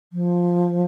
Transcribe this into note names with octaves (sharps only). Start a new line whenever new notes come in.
F3